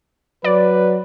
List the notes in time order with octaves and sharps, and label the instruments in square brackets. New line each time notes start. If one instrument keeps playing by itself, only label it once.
[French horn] F#3 [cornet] B4 [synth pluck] D5